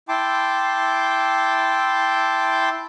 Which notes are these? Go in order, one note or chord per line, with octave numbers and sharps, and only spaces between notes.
E4 G5 A5 C6 D6